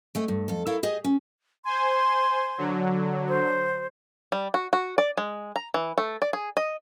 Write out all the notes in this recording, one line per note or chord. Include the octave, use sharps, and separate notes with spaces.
G#3 A3 C4
G2
F2 A4
E4 A4 A#4 C#5 F5
G4 G#4 D#5
C#4
C5 G#5 C6
D3 F#3
C5
G3
F#4
F#4
D5
G#3
A#5
E3
A3
D5
G#4
D#5